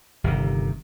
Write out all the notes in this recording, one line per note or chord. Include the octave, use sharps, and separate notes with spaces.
G1 C3 D#3